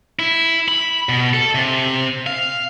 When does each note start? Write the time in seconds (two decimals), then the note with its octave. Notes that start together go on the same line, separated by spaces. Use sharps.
0.19 E4
0.68 B5
1.09 B2
1.33 A4
1.55 C3
2.27 F5